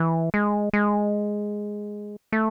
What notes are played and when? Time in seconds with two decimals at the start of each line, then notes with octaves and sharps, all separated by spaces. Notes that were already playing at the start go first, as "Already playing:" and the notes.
Already playing: E3
0.34 G#3
0.73 G#3
2.32 A3